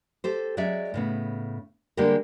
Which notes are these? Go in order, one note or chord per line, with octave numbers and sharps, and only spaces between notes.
G4 A4 C5
F#3 G#3 C#4 D5 E5
A2 C#3 B3
D3 G3 G#3 A#3 G4 A#4